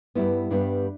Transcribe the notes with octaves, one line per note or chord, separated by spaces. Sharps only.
G2 G3 B3 E4
G2 G3 B3 D4